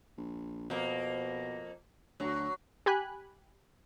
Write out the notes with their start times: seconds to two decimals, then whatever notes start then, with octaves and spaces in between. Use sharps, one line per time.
0.17 A#1
0.70 F2 B2 A#3
2.20 D2 F#3
2.86 G4 G#5 B5 F#6